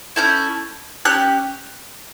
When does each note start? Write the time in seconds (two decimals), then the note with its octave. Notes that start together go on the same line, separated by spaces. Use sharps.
0.16 C#4 E4 A4 G6
1.05 C#4 G4 F#6